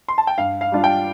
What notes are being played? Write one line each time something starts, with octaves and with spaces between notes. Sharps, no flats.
C6
A5
G5
G2 F5
F5
G3 D4 F4
G5